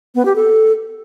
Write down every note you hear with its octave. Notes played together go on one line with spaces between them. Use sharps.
B3
G4
A4